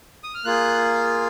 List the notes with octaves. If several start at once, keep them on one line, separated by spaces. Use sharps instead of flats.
D#6
F6
A#3 F4 G#4 F#6